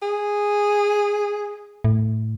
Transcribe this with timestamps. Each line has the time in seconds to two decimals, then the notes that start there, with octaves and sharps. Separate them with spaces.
0.02 G#4
1.84 A2